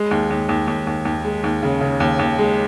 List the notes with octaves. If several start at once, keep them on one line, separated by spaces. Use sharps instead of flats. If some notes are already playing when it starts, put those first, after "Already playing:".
Already playing: G#3
D#2
D#2
D#2
D#2
D#2
D#2
G#3
D#2
C#3
C#3
D#2
D#2
G#3